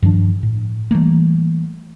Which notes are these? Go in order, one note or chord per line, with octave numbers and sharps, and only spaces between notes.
G2 D#3 F3 D4
A2
E3 G3 A3 A#3